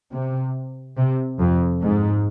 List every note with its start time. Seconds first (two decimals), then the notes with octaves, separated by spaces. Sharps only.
0.11 C3
0.97 C3
1.39 F2
1.82 G#2